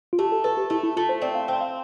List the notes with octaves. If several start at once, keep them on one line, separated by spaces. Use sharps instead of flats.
F4
A3 G4
A4
A4 B4
G4
A3 E4
E4
A3 F4
C5
C4 D5
F5
C4 G5
F5